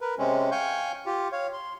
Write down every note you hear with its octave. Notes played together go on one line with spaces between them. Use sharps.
A#4 B4
C3 G#3 C4 C#4
F5 G5 G#5 C#6 G6
F4 G4
C#5 F5
C6